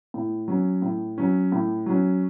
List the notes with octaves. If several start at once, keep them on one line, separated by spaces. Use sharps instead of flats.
A2
F#3 C#4
A2
F#3 C#4
A2
F#3 C#4